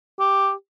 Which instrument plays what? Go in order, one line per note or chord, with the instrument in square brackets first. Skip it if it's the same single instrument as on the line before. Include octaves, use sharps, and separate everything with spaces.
[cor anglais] G4